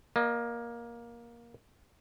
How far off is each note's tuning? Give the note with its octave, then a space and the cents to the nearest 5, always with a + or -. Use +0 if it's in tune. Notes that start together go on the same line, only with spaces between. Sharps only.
A#3 +15 D#5 -25